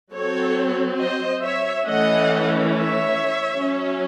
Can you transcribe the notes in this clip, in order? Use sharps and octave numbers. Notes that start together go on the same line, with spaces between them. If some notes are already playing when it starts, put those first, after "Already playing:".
F#3 C4 A4 C#5
C5 D#5
C#5 E5
E3 A3 C#4 D#5 F#5
C#5 E5
F#3 C#4